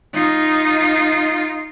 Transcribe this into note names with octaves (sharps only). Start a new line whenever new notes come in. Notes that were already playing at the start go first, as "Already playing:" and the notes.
D#4 F4